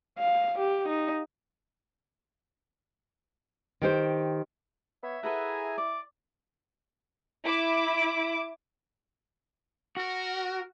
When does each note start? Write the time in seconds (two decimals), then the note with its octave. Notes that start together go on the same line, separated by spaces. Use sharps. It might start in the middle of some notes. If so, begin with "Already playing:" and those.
0.19 F5
0.59 G4
0.89 D#4
3.82 D#3 G4 C5
5.03 B3 C#5 E5
5.23 E4 G#4 A4 B4 F#5 G#5 A#5
5.78 D5 D6
7.45 E4 D6
9.97 F#4 A#4